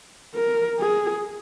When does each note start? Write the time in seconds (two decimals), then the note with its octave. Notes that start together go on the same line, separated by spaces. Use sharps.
0.35 A#4
0.79 G#4